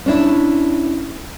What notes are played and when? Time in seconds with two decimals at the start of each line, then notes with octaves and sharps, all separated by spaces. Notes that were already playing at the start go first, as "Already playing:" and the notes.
0.06 C#4 D4 E4